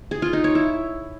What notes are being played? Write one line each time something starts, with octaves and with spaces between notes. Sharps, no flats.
G#4
F4
D#4
C#5
E4